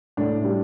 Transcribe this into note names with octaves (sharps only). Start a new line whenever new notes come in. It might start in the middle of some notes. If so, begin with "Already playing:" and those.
A2 D4
G3